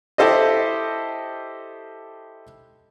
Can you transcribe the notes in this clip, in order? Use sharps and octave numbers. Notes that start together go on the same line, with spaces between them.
E4 G4 A4 C5 D#5